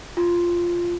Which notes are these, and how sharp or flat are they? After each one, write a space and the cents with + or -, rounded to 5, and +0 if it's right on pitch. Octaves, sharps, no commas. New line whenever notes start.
F4 -5